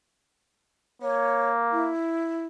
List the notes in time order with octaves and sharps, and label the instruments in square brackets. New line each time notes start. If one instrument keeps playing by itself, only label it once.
[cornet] A#3 [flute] C#5
[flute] E4